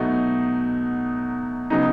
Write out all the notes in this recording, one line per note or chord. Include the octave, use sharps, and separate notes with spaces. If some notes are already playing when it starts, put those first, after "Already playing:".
Already playing: B2 F#3 A3 D#4 F#4
C#3 F#3 B3 D#4